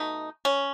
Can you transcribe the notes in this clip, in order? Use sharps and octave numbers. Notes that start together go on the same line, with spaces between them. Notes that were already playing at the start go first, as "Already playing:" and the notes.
Already playing: B2 A3 D#4
C#4